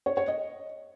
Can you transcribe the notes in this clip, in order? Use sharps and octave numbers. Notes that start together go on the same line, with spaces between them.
C#5
C#5
D#5